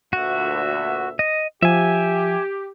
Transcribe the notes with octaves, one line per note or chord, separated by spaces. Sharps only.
D2 A#2 F#4 E5
D#5
F3 G4 E5 G#5